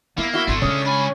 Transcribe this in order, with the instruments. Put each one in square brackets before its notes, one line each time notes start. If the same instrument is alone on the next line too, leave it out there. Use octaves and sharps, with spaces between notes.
[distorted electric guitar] A#3 [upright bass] B3 [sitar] E4
[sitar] E4 F#4 [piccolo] G7
[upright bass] G#1 B3 [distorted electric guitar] A3 D4 [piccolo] C6
[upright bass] C#3 G#3 [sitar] C#4 [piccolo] D#6
[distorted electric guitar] D4 G#5 [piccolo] B5